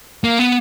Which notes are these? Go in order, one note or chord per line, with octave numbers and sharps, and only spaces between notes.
A#3
B3